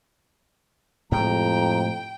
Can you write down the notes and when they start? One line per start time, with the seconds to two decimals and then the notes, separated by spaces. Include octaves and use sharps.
1.12 F2 A2 C3 G#3 G5 A#5